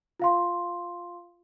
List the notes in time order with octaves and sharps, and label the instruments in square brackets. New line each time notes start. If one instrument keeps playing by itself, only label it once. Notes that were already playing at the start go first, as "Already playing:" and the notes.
[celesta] F4 F5 C6